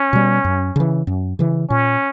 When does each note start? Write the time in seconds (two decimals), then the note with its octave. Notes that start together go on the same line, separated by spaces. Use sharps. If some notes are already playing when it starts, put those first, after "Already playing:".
Already playing: C#4
0.13 B2 G3
0.45 F#2
0.76 C#3 E3
1.07 F#2
1.39 C#3 E3
1.70 A#2 C#4